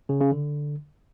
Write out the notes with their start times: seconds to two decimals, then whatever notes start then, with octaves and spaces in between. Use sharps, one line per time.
0.09 C#3
0.21 C#3
0.32 D3